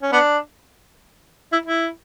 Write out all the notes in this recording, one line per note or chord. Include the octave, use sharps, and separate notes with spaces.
C#4
B3 D4
E4
E4